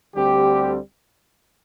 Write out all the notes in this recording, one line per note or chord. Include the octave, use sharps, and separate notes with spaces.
D2 D3 G3 C4 G4